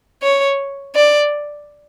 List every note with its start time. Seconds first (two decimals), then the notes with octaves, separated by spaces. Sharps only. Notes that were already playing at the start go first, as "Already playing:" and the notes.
0.23 C#5
0.95 D5